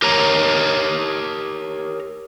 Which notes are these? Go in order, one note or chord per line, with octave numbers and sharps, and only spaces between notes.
G4 A#4 C#5 A#5